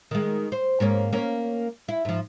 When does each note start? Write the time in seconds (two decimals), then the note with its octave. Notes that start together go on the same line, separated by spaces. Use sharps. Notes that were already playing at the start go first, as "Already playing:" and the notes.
0.11 D#3 G#3
0.52 C5
0.80 G#2 A#3 C#4
1.13 A#3 C#4
1.88 E4
2.05 G#2 F3